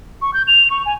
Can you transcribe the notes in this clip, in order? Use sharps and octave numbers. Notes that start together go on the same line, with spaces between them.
C#6
G6
F7
C#6
G#5